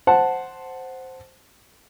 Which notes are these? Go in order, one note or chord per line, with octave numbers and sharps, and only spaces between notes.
C5 F#5 A5